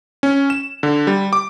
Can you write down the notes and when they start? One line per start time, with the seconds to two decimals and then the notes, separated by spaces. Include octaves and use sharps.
0.23 C#4
0.50 E7
0.83 D3
1.07 G3
1.33 D6